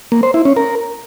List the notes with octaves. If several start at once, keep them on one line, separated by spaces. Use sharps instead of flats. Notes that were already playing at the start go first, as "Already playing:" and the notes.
A#3
C5
E4
C#4
A#4